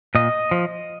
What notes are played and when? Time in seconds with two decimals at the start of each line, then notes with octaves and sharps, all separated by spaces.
0.15 A#2 D#5
0.51 F3